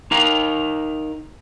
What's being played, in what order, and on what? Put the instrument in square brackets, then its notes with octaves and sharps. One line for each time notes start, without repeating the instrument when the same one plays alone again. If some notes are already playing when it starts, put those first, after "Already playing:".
[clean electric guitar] D#4 A#4 F5 A#5